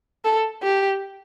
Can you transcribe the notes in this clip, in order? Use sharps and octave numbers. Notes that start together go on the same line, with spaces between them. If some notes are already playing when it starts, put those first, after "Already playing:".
A4
G4